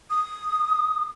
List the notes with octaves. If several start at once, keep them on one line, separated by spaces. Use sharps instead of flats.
D#6